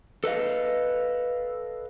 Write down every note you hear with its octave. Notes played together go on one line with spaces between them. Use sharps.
A4 B4 D#5 F5